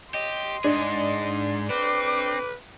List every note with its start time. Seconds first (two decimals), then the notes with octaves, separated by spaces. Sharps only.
0.14 G4 D#5 C6
0.64 G#2 D4 G#4 D#5
1.70 C4 B4 D6